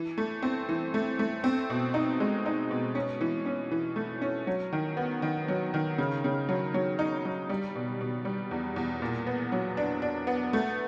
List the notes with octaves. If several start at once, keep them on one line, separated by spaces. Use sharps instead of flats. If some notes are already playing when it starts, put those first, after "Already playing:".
Already playing: E3
A3
C4
E3
A3
A3
C4
B2
D#4
G#3
D#4
B2
C#4
E3
C#4
E3
A3
C#4
F#3
D#3
B3
D#3
F#3
D#3
C#3
C#3
F#3
F#3
D#4
F#3
G3
B2
B2
G3
E2
E2
A#2
B3
F#3
D4
D4
B3
A3